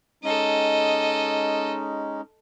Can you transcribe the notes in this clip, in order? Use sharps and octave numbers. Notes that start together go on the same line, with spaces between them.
G#3 C#4 D#4 A4 D#5